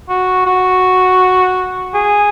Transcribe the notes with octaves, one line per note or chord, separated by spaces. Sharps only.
F#4
F#4
G#4